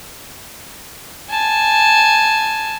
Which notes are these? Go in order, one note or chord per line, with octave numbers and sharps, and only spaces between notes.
G#5 A5